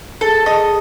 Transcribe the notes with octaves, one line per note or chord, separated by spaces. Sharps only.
G#4 A4
D#5